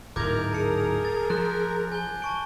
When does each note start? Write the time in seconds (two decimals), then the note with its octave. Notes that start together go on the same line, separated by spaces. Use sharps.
0.16 D1 G#2 A#4 D6 G6 G#6
0.53 G#4 A5 C#7
1.05 A6
1.30 F3 F#6 G6
1.92 G#5 G6 G7
2.22 A5 C#6 D7